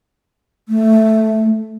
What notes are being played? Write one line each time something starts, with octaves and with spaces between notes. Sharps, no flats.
A3